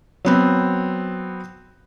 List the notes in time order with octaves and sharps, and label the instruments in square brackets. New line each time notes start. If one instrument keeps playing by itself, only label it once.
[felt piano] F#3 B3 C4